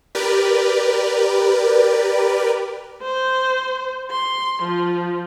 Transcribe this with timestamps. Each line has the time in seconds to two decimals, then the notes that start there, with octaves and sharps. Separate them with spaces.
0.15 G4 A#4 B4 D5
3.03 C5
4.11 C6
4.63 F3